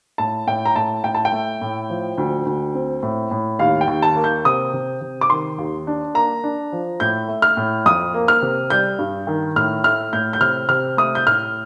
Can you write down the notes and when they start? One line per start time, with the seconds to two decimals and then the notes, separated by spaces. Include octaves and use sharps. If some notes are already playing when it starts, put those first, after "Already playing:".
0.18 A2 A5
0.47 A2 G5
0.65 A#5
0.76 A2 A5
1.04 A2 G5
1.15 A5
1.25 G5
1.32 A3
1.61 A2
1.90 F3
2.18 D2
2.46 D2
2.75 C4
3.02 A2
3.31 A2
3.59 D#2 F5
3.81 G5
3.87 D#2
4.02 A5
4.16 A#3
4.24 G6
4.45 C3 D#6
4.73 C3
5.01 C3
5.21 D6
5.30 D#3 C6
5.58 D#2
5.87 D4
6.14 A#3 A#5
6.44 D4
6.72 F3
7.00 A2 G6
7.28 A3
7.42 F6
7.57 A2
7.86 F2 D#6
8.14 A#3
8.28 F6
8.42 C3
8.70 G3 G6
8.99 G2
9.27 D#3
9.56 A2 F6
9.84 A3 F6
10.13 A2 G6
10.33 G6
10.40 C3 F6
10.69 C3 F6
10.97 A3 D#6
11.15 G6
11.26 A2 F6